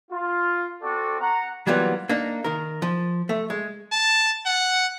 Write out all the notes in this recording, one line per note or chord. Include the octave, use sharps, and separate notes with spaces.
F4
C4 F#4 A4 D5
F#5 A#5
E3 F#3 G3 A#3 B3 F4
A#3 D4 D#4
D#3 A#4
F3
A3
G#3
A5
F#5